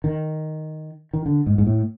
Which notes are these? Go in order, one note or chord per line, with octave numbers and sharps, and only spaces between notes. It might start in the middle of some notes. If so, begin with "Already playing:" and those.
D#3
D#3
D3
G#2
G#2
A2